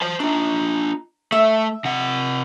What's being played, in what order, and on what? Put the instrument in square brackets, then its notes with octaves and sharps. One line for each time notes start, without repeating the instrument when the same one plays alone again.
[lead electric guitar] C5 A5
[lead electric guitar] D4 F4 [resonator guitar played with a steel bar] D#4
[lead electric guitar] A3 [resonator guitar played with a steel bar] E5
[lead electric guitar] C3 F#5